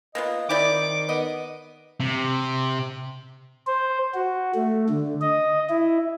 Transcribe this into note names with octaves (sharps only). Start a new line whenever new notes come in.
A#3 B3 F4 D#5
D#3 C4 E4 D5 D6
B3 D#5
C3
C5
F#4
A3
D3
D#5
E4